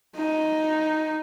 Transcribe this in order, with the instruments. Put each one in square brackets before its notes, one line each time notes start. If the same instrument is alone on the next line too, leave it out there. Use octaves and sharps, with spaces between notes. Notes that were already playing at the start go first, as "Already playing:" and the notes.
[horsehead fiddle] D#4